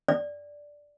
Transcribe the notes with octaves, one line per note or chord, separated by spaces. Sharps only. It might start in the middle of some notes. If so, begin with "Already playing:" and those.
D5